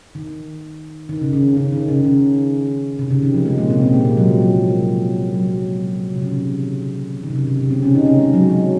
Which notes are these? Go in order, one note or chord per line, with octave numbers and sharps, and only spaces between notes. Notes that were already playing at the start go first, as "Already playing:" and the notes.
D#3
D#3
C#3
C#3
C#3
D#3
C#3
C#3
C3
C#3
D#3
F3
G#3
A#2 A#3
C3 C4
C3 C4
A#2 A#3
G#3
F#3
F3
F#3
F3
F#3
C3
C#3
D#3
D#3
C3
C#3
C3
C#3
C3 C4
C#3 C#4
D#3 D#4
C#3 C#4
G#3
F#3
F#3